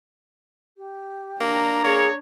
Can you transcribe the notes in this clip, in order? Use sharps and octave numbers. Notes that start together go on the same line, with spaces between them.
G4
A#3 D4 A#5
A#3 G#4 C#5